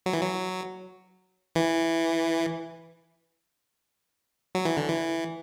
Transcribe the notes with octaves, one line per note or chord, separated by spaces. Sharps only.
F#3
E3
F#3
E3
F#3
E3
D3
E3